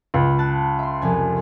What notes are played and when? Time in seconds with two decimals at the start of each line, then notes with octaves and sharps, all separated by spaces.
0.14 C#2
0.39 A5 F#6
0.79 E5 C6
1.01 C2 F2 G#5